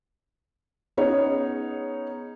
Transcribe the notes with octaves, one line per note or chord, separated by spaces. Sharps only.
B3 C#4 D#4 G#4 C#5